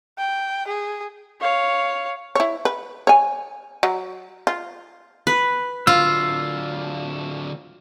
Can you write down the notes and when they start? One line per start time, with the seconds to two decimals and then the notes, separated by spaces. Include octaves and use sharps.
0.18 G5
0.67 G#4
1.41 C#5 F5
2.35 E4 C#5
2.65 B4
3.07 C#5 G#5
3.83 F#3
4.47 F4
5.27 B4
5.87 D3 F#3 F4 E6